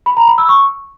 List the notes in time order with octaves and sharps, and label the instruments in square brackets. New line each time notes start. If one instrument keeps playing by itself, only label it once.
[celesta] B5
A#5
B5
E6
C#6